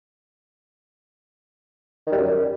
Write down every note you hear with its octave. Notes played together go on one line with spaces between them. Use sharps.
D#3
G3
F#2